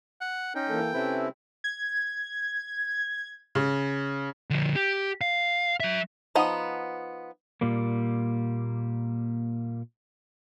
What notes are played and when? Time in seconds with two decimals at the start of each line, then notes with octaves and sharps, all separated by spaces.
0.21 F#5
0.55 C#4 D#4 G5
0.69 E3 A#3 A4
0.93 C3 C4 C#4 E4 A4 B4
1.64 G#6
3.55 C#3
4.50 D3 F3
4.76 G4
5.21 F5
5.80 F#3 E5
6.35 F3 B3 D#4 F#5
7.61 A#2 G3 A#3